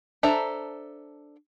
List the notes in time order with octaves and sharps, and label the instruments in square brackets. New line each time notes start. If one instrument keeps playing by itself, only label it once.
[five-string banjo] D4 A4 C5 E5 A#5